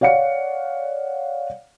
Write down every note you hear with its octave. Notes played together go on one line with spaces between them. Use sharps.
C#5 D5 F5 F#5 C#7